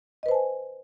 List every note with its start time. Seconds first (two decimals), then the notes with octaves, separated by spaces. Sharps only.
0.23 D#5
0.26 B4
0.29 C5
0.31 A5
0.34 G#5